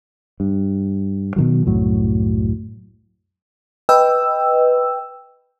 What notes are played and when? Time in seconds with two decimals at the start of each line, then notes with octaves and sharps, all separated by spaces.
0.40 G2
1.36 B2 D#3 F#3
1.65 C2 F#2 A2 F#3
3.89 B4 D#5 G5 E6